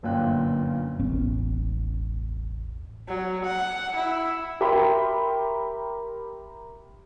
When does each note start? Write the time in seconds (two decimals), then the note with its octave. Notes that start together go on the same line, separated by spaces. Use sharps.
0.03 G1 F#2 A#2 F4 G5 F#6
0.99 E1 A1 B3 C#4
3.08 F#3
3.44 F#5
3.96 E4
4.61 G4 A#4 E5 G5 B5 C6